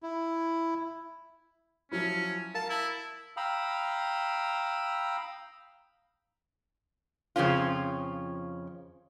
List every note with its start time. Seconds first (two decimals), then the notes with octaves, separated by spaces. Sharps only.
0.03 E4
1.92 F3 F#3 C#4 E4
2.54 A#4 F5 A5
2.70 E4
3.37 F5 G5 A#5 B5 D#6 E6
7.36 F2 C#3 F3 C#4 F4